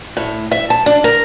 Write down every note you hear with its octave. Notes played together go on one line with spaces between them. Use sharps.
A2
E5
A5
D4
A#4